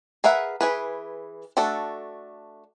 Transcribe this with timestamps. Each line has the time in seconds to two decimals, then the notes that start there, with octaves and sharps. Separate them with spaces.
0.24 G#4 A#4 B4 E5 F#5
0.61 E3 G#4 B4
1.57 A3 D4 F#4 A4